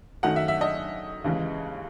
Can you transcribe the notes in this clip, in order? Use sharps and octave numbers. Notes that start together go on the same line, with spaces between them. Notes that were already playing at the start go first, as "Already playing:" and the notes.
F#2 D#3 F#3 A3 D#4 F#5
E5
E5
D#5
D#2 C#3 E3 G#3